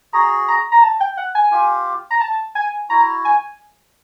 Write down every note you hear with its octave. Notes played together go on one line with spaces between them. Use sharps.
F#4 G#4 A#5
A#5
A#5
A5
G5
F#5
G#5
F4 G4
A#5
A5
G#5
E4 F#4 A#5
G#5